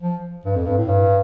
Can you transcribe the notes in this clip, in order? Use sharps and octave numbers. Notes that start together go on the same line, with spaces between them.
F3
G2
F2
G2
A2
G2